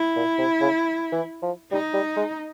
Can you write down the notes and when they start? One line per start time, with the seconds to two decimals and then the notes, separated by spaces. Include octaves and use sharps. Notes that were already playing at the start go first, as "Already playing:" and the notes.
Already playing: E4
0.16 A#2
0.38 C3
0.61 C#3
1.12 E3
1.42 F3
1.71 G3 D#4
1.94 G3
2.16 G#3